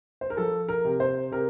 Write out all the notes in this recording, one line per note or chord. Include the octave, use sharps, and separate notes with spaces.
C5
A#4
F3 A4
A#4
C3
C5
C3 A#4